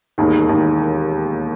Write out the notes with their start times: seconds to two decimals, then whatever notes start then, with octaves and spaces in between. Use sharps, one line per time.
0.18 E1 D#2 D#3
0.48 E1 D#2 D#3